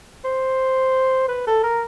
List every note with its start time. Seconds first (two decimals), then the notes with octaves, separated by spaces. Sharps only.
0.25 C5
1.28 B4
1.47 A4
1.64 A#4